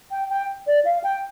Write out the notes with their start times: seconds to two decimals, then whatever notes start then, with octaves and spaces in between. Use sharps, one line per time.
0.11 G5
0.30 G5
0.67 D5
0.85 F5
1.04 G5